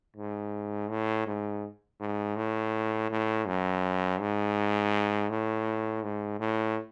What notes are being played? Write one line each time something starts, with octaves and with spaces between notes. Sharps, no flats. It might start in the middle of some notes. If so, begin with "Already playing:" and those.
G#2
A2
G#2
G#2
A2
A2
F#2
G#2
A2
G#2
A2